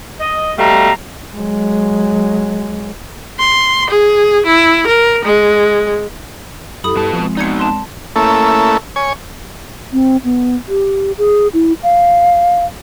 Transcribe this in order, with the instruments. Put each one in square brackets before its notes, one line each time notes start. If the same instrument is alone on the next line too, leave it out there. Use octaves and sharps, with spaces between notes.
[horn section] D#5
B2 G3 A3 F5 A#5
[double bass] F#3 G#3
[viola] C6
G#4
E4
A#4
G#3
[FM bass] F#2 [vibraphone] E4 G4 A4 [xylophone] B5 D#6
[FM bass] G2 [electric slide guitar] B2 A5
[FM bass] F3 [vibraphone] G#3 C4
[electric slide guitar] B3 D#4 [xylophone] D5 G#6 C#7
[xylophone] A5 C6
[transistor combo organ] A3 A#3 C#4 E4 A4
C#5 G#5
[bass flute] C4
B3
G4
G#4
E4
F5